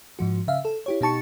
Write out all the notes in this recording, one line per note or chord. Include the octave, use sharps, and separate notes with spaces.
G#2 F3 F#4
C#3 E5 F5
A4
E4 G4 C#5
B2 D#4 G4 A5 C#6 C#7